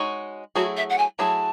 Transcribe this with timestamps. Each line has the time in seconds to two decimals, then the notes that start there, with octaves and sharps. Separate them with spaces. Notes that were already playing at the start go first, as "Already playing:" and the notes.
Already playing: G#3 D#4 F#4 C#5
0.56 F#3 A3 E4 F#4 G#4
0.76 E5
0.89 F#5
0.98 G#5
1.19 F#3 A3 E4 G#4 A5